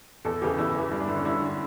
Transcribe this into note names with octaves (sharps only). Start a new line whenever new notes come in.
E2 A4
C#3 E3 G4
E2 E4
C#3 E3
G2
D4
D3 E4
C#4
G2 E4
D3